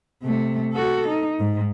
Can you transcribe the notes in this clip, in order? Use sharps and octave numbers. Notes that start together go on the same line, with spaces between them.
C3 A3
F#4 A4
D#4
G#2